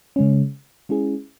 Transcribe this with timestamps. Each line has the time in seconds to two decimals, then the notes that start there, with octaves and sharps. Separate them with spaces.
0.16 C#3 G#3 C#4
0.89 G#3 C#4 E4 G#4